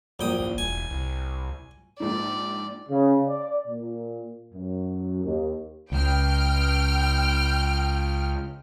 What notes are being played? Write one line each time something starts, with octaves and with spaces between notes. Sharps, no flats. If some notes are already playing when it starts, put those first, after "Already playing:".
A#1 F#2 G5 D#6
A1
E1 G#5
C2
A#1 G#2 D5
C#3
D5
A#2
F#2
D#2
C#2 G5 F6